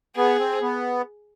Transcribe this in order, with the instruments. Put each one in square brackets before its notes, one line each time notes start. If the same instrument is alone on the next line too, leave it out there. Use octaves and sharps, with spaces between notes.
[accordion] B3 [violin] G#4
[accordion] C4
B3